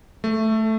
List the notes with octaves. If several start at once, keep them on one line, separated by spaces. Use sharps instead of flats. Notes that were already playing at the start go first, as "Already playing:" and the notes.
A3